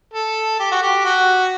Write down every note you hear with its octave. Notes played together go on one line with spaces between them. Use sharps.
A4
G4
F#4
G4
F#4